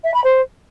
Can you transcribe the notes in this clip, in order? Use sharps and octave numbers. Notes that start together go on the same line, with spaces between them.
E5
B5
C5